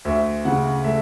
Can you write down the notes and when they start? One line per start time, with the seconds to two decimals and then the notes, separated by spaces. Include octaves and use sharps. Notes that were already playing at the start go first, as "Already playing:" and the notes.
0.05 D2 E5
0.45 C#3 F#5
0.84 A3 E5